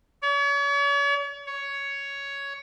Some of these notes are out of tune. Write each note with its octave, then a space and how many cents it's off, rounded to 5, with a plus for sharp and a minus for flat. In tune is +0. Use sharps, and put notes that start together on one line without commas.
C#5 +40
C#5 +10